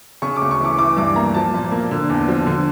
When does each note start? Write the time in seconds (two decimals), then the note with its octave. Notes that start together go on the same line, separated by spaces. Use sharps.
0.22 C#3 C#6
0.36 D6
0.42 D2
0.51 C#6
0.60 E3 D6
0.78 E3 D6
0.97 G2 D6
1.16 A#3 A#5
1.34 F3 A5
1.54 A#2
1.71 A#3
1.91 D3
2.10 E2
2.28 F3
2.47 D3